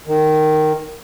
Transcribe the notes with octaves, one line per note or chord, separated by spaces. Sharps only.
D#3